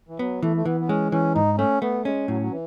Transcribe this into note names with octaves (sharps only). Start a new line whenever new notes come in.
E3
F#3 B3
E3 A3
A3
E3 B3
B3
G#3 C#4
E3 C#4
G#2 D#4
A3 C#4
A3 B3
G#3 C#4
A2 F#3
F#3
E3